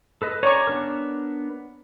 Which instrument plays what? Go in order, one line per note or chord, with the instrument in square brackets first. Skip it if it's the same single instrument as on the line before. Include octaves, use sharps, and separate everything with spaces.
[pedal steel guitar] A4 B4 D#5
[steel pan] C#5 D5 C#6 [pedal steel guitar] A#5
[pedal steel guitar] B3 D4 A#4